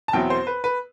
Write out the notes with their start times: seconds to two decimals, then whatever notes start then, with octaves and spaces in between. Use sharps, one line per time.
0.08 A5
0.13 E2 B2 F#3 C4 E4 G5
0.30 C5
0.47 B4
0.64 B4